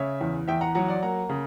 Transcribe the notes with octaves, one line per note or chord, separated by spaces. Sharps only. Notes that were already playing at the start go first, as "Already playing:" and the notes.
Already playing: C#3 C#5 E5
E2
E2 E5 G5
F#5 A#5
F#3 F#5 A#5
D5 F#5
A#3 F#5 A#5
C#3